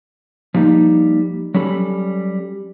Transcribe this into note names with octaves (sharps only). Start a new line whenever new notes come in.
F3 G3 A#3 D#4
F#3 G3 C#4 A4 B5